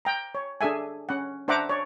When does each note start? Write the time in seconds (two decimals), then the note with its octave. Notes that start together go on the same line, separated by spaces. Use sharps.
0.05 G5 A#5
0.35 C#5
0.61 D4 G#4 A4 E5 G#5
1.09 C#4 F#5
1.48 D4 C5 E5 F#5 A#5 D6
1.69 C#5 D5